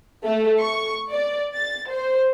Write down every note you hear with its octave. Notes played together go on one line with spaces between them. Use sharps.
A3
C#6
D5
A6
C5